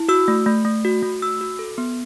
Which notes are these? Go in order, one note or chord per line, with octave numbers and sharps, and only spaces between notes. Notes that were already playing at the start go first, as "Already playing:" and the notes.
Already playing: E4
F#4 E6
A3
A3
A3
F#4
A3
F#4 E6
F#4
A4
B3